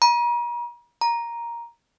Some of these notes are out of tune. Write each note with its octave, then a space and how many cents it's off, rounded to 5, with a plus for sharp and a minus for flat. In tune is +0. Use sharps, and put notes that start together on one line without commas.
A#5 +40
A#5 +5